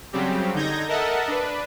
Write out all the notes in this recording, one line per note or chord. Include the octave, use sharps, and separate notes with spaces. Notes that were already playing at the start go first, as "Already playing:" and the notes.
C#3 F#3 G3 C4 G4
D3 D#4 G6 G#6 A#6
A4 A#4 D#5 E5 F#5 A5
D4 B4